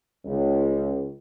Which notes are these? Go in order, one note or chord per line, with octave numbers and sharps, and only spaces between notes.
C#2